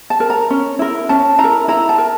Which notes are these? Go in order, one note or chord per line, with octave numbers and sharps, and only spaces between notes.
A5
A#4
A#5
C#4
E4 A#4
C#4 A5
E4 A#5
A#4
E4 A#5
A5
A#4